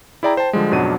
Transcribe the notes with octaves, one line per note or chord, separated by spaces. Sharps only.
E4 G#4 D5 G5 A#5
C5 G5 A5
D3 F3 G3 G#3
F2 G#2 B2 F#3 D4 D#7